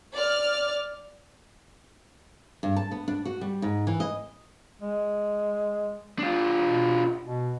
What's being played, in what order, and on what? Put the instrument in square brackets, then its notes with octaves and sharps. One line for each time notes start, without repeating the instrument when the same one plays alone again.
[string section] D5 F6
[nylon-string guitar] G2
A5
B3
D4
F#4
G3
G#2
E3
D#5
[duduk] G#3
[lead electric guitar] D4 F4
[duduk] B2
B2